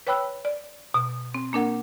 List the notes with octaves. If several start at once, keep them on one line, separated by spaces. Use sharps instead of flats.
B4 C#5 G5 B5 E6 F#6
D5
B2
C4
A#3 D4 A#4 F#5